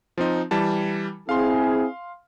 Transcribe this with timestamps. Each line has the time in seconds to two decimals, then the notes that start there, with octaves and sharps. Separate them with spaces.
0.18 F3 C4 D#4
0.51 E3 G3 A5
1.29 C4 E4 G#4 F5 C6